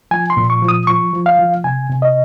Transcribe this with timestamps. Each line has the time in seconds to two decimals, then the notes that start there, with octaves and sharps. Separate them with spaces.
0.11 F3 G#5
0.30 C6
0.37 A#2
0.50 C#6
0.62 F3
0.68 D#6
0.87 F3 C#6
1.13 F3
1.26 F5
1.39 F3
1.64 C3 G#5
1.90 C3
2.02 D#5